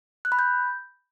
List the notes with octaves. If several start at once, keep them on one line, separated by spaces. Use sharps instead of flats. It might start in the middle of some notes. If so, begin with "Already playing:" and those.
F#6
B5
G6